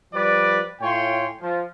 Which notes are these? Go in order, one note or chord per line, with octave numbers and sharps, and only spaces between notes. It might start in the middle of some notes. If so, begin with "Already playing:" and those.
F3 G3 B4 D5
A2 F4 C#5 G5 G#5 C6
F3